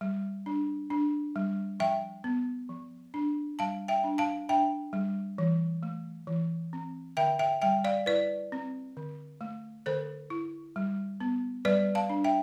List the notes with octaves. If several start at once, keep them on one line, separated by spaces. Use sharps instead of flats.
G3
D4
D4
G3
F3 E5 G5
B3
F3
D4
G3 F5 A5
E5 G5
D4
F5 A5
D4 E5 G5
G3
E3
A3
E3
C4
D3 E5 G5
E5 G5
G3 E5 G5
D5 F5
E4 B4 D5
C4
D3
A3
D3 A4 C5
E4
G3
B3
G3 B4 D5
F5 A5
D4
E5 G5